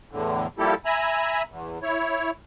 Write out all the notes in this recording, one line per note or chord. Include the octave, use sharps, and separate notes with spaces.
E2 A2 D3
F3 G3 A#3 E4 G4 A4
E5 G#5 A#5 B5
E2
E4 C#5